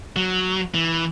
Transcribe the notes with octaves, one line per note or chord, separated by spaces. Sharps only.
F#3
E3